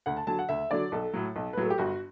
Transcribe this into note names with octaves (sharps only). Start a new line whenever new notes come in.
D2 F#5
A5
D3 F#3 A5
F#5
D2 E5
D3 F#3 D5
B1 A4
A2 F#3
B1
B4
A2 F#3 A4
G4
G1 F#4